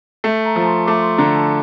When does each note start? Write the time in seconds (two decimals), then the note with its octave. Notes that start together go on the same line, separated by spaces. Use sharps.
0.24 A3 A5
0.45 A#5
0.56 F3
0.62 A#5
0.67 C6
0.86 A3 D6
1.02 C6
1.18 D3 A#5
1.34 A5